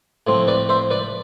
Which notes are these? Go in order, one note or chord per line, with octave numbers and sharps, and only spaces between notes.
A2 F3 C4
B4 D5
C5 E5
B4 D5